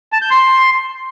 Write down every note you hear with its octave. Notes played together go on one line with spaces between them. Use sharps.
A5
G6
C6